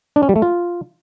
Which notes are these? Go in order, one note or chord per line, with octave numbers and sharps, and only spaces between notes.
D4
C#4
G3
A3
F4